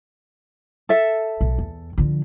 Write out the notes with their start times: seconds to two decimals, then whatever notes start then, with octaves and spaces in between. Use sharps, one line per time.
0.89 A4 E5
1.41 B1
1.59 E2
1.98 D3 F3